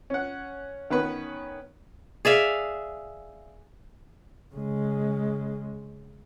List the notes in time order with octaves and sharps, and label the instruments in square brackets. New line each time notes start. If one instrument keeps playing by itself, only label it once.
[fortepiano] C#4 F#5
D#3 B3 C#4 B4
[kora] G#4 D5 E5 F5
[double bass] C#3 G#3